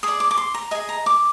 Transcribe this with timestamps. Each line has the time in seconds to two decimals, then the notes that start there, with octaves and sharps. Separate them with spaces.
0.03 G#4 D5 D#6
0.20 D6
0.31 D6
0.38 C6
0.54 A#5
0.71 G#4 D#5 G#5
0.89 A#5
1.06 D6